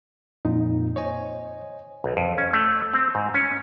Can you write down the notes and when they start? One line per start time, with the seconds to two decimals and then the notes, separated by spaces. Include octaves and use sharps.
0.45 F2 A#2 D#4
0.96 C5 C#5 D#5 G#5
2.04 B1
2.17 F2
2.38 C#4
2.53 A3
2.94 C4
3.15 G#2
3.34 C#4